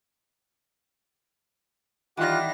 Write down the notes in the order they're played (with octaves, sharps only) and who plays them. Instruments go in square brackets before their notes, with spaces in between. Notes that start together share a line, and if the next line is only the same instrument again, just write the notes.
[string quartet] D#3 G3 A#6 [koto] E3 [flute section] F4 F#6 [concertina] G4 F#5